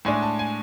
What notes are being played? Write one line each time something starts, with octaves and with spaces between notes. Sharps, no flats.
A2 G#3 D4 G#5
A5
G#5